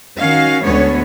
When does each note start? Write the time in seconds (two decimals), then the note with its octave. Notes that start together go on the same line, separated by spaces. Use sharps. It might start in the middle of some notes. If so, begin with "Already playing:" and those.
0.18 D#3 C#4 F#4 F5
0.63 D2 G#3 B3 C#4 C#5